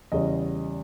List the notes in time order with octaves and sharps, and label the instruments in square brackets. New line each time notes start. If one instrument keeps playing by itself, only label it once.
[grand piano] E2 C#3 G3 D#5